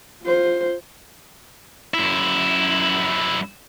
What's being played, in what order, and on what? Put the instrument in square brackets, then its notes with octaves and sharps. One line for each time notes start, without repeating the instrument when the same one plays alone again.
[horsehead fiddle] F4 C5
[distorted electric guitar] F#2 E4